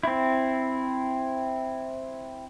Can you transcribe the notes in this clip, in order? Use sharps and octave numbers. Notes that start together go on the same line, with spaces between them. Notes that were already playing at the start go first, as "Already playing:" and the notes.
C4 E4